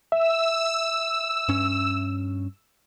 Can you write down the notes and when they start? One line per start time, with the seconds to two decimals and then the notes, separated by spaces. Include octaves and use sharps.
0.12 E5 E6
1.48 G2 C#4